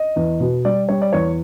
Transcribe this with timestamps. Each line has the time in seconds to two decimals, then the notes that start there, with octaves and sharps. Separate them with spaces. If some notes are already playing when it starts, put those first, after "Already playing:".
Already playing: D#5
0.16 E2
0.40 B2
0.65 G3 D5
0.89 G3 C#5
1.02 D5
1.13 E2 C#5